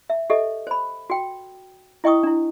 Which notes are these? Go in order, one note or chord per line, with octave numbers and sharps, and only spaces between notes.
E5
G4 A4 D#5 E5
C5 B5
F#4 G5
E4 D#5 G5 C#6 D#6
D4 E4